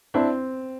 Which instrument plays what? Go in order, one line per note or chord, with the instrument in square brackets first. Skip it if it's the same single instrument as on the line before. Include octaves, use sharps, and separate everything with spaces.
[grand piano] C4 [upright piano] D4 E4